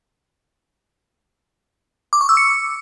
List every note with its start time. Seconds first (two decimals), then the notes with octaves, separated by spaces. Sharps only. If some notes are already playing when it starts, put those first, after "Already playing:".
2.13 D6
2.21 C#6
2.29 E6
2.37 C#7